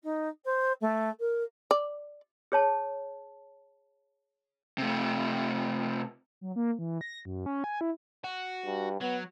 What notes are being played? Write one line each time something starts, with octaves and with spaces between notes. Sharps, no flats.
D#4
C5
A3
A#4
D5
G#4 C#5 A5
C3 A3
F#3
A#3
E3
A#6
F#2
C#4
G#5
E4
F#4
G2
F#3 B3